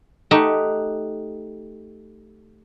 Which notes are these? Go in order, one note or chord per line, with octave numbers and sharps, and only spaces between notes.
A3 D#4 G4 F#5